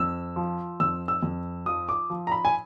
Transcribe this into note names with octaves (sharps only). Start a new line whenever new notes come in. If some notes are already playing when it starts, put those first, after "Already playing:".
Already playing: F2 E6
F3
F2 E6
E6
F2
F3 D#6
D6
F3
A#5
B5
G#5